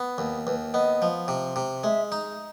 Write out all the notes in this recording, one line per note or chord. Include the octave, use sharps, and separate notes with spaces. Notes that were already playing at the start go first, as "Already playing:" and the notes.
Already playing: B3
D#2
D#2 B4
B3 D#5
F3
C3
C3
G#3 E5
D#4